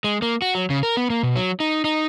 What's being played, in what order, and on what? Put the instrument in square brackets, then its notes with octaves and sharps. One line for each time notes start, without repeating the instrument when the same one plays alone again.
[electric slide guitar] G#3
A#3
F#4
F#3
C#3
A#4
B3
A#3
B2
F#3
D#4
D#4